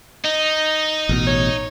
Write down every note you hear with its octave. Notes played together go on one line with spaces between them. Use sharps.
D#4 D#5
A1 B2
C#5